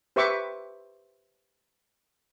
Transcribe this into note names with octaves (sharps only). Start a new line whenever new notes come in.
G4 B4 C5 E5 C#6 D6